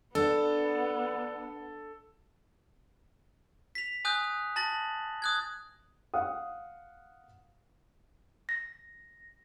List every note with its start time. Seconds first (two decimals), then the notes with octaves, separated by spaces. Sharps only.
0.15 B3 D4 A4
3.75 B6 F7
4.05 G#5 D#6 F#6 G6
4.56 A5 A6 A#6 F#7
5.22 D#6 F#6 G#6
6.14 F5 F#5 D#6
8.49 A#6